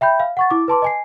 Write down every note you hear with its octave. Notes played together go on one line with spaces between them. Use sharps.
E5 G5 B5 G6
F5
F#5 C#6 A6
E4 D6
B4 A5 C6 D6
D#5 G#5 C7